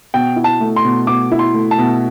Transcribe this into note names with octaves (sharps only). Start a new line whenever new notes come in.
B2 G5
E4
A5
A3
C6
B2
B2 D6
E4
C6
A3
A5
B2